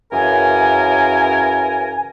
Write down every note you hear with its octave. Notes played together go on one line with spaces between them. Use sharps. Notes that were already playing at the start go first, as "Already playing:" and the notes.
F#2 C#3 E3 C#4 A#4 G#5